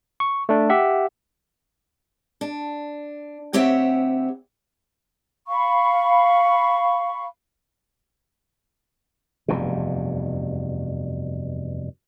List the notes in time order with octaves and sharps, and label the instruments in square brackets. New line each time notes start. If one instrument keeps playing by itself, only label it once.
[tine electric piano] C#6
A3 D4
G4 E5 F#5
[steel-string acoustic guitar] D4
D2 C4 G4 C#5 E5 F#5
[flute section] F5 B5 C#6
[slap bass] F1 E2 G2 B2